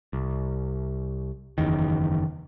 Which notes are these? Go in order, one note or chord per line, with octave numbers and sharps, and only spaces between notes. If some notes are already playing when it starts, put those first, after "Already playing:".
C2
F#1 E2 D#3